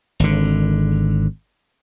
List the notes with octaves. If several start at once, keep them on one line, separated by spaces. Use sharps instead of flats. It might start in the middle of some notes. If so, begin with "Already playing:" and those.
G#1 D3